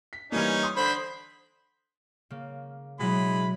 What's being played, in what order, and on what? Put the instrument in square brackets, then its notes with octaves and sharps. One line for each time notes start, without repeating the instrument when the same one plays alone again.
[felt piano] B6
[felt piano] E3 G3 A#3 [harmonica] C#4 D#4
[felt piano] C6 D#6
[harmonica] D3 C5 B5
[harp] C#3 A#3
[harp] B2 F#3 [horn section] G#3 E4 B5